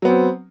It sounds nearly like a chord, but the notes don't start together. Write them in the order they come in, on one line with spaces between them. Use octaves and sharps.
F#3 B3 C4